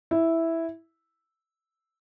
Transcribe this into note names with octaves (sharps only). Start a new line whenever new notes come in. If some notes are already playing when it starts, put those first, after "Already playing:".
E4